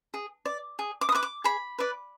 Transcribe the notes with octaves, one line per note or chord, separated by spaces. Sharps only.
G#4
D5
G#4
D6
D#6
B4 D5 D6
D6
G#4 B5
B4 D5